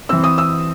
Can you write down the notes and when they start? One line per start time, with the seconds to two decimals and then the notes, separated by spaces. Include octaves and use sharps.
0.09 E3 C4 E6
0.24 D#6
0.38 E6